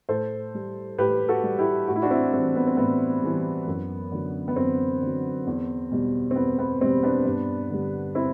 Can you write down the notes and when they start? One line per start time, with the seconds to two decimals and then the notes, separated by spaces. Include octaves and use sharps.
0.09 A2 A4 C5
0.54 G3
0.98 A2 G4 B4
1.28 F#4 A4
1.43 G3
1.59 E4 G4
1.88 A2 F#4
1.96 E4
2.02 D4 F#4
2.11 C4 E4
2.33 E3 G3 C4
2.56 B3
2.67 C4
2.77 A2 B3
3.23 E3 G3
3.67 F#2
4.12 D3 F#3
4.48 B3
4.56 F#2 C4
5.02 D3 F#3
5.47 E2
5.91 B2 G3
6.31 C4
6.35 E2 B3
6.59 B3
6.81 B2 G3 C4
7.03 B3 D4
7.25 G2
7.70 D3 G3
8.15 C4 E4